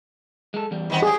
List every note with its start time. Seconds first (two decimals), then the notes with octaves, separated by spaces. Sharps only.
0.54 G#3 A4
0.71 E2 G3
0.90 D#3 B3 C4
1.02 E3 G4 G#4